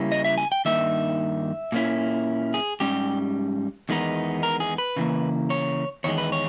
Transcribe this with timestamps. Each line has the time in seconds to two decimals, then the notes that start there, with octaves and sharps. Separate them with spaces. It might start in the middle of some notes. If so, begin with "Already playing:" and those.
Already playing: C#3 G3 A#3 C#4 E4
0.12 D#5
0.24 E5
0.38 G#5
0.52 G5
0.65 G2 D#3 A#3 D#4 E5
1.72 A#2 A#3 C#4 E4
2.54 G#4
2.80 G#2 G3 C#4 G4
3.89 E2 D#3 G#3 B3 D#4
4.43 A#4
4.60 G#4
4.78 B4
4.96 C#3 E3 A#3
5.50 C#5
6.04 E2 D#3 G#3 C#5
6.18 B4
6.32 C#5